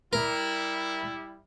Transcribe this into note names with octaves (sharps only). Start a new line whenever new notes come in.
G3 E4 A#4